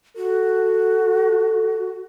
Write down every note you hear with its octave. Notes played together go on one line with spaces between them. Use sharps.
F#4 A4